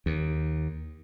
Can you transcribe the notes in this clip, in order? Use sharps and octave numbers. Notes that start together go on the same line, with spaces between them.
D#2